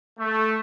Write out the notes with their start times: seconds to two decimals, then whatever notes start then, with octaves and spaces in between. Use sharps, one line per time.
0.20 A3